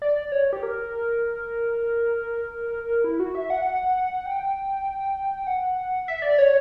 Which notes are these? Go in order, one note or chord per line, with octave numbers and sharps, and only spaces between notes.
D5
C#5
G4
A#4
E4
F#4
E5
F#5
G5
F#5
E5
D5
C#5